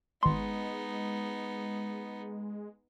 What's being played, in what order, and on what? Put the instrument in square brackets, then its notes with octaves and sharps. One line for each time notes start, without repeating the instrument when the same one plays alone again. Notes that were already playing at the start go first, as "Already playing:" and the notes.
[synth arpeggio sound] G#1 C6 [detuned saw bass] G#3 [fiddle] B3 D#4